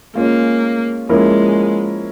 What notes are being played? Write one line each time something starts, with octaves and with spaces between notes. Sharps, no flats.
G#3 A#3 C#4 F4
F3 G#3 A#3 C#4 E4 A#4